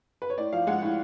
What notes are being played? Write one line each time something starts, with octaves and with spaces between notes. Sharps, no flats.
B4
C#5
A2 D5
F3 F5
G#3 F#5
A2